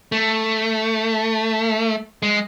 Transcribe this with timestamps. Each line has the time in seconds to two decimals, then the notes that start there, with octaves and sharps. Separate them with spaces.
0.12 A3
2.22 G#3